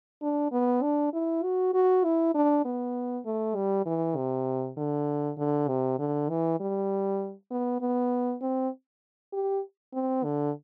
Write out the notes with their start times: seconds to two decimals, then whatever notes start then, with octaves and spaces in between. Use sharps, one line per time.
0.22 D4
0.52 B3
0.82 D4
1.13 E4
1.43 F#4
1.73 F#4
2.04 E4
2.34 D4
2.65 B3
3.25 A3
3.55 G3
3.86 E3
4.16 C3
4.77 D3
5.38 D3
5.68 C3
5.99 D3
6.29 E3
6.60 G3
7.50 B3
7.80 B3
8.41 C4
9.33 G4
9.93 C4
10.24 D3